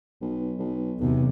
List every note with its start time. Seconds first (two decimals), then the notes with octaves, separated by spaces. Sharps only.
0.21 B1
0.59 B1
0.99 B1 E2 C3